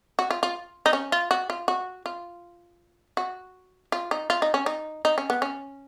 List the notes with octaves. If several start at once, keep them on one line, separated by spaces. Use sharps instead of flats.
F#4
F4
F4
D#4
C#4
F4
F#4
F4
F#4
F4
F#4
F4
D#4
F4
D#4
C#4
D#4
D#4
C#4
B3
C#4